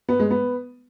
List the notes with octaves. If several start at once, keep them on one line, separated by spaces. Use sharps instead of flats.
B3
G#3
B3